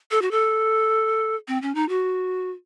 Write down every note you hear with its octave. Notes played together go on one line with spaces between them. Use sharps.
A4
F#4
A4
C4
C#4
D#4
F#4